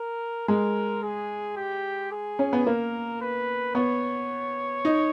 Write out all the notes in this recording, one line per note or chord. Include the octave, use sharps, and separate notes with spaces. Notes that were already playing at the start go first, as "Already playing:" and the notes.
Already playing: A#4
G#3 A#4
G#4
G4
G#4
C#4
B3
A#3 A#4
B4
B3 C#5
D#4